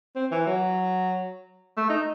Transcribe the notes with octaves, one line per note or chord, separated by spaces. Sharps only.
C4
E3
F#3
A3
D#4